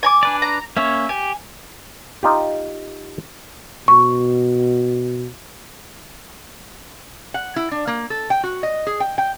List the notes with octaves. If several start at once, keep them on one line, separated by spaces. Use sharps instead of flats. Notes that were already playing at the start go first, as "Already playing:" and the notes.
G#5 A#5 D6
D4 B4 D5
A#5
A#3 C#4 C#5 E5
G4 G#5
D#4 F4 G4
B2 C#6
F#5
E4
D4
A#3
A4
G5
F#4
D#5
G#4
G5
G5